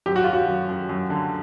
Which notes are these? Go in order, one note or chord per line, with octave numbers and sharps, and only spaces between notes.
F#2 G4
F#4
F#3 F4
F#4
F#2
F#2
F#2
D3